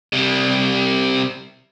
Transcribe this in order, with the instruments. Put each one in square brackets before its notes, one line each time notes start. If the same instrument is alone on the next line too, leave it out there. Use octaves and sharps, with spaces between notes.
[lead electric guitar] C3 G3